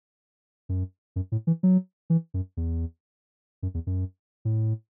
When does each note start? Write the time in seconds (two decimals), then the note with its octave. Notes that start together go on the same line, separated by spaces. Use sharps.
0.69 F#2
1.16 F#2
1.32 A2
1.47 E3
1.63 F#3
2.10 E3
2.34 F#2
2.57 E2
3.63 F#2
3.74 E2
3.87 F#2
4.45 A2